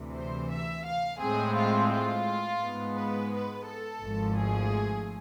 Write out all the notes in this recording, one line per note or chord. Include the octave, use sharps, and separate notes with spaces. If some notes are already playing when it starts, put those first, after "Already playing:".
Already playing: D2 C3 E3
C5
E5
F5
A2 G#3 C4 G#4
F4
F4
G#2 G#3 B3
B4
B4
A4
G#1 G#2 F3 A3
G#4